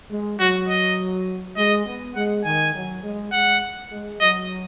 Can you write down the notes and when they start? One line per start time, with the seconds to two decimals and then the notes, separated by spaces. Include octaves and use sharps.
0.10 G#3
0.39 F#3 F#4
0.68 D#5
1.57 G#3 D#5
1.86 B3
2.16 G#3 F#5
2.44 D#3 G#5
2.75 F#3
3.03 G#3
3.32 G#3 F#5
3.91 G#3
4.21 F#3 D#5